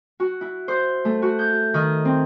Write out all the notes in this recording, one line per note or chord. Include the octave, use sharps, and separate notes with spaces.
F#4
E4
C5
A3
F#4
G6
D#3
C4